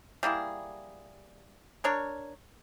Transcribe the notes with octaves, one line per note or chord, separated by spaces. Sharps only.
G3 A#3 E4 G#4
D4 A#4 C#5